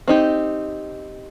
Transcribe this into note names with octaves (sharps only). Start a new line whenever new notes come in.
C4 D#4 G4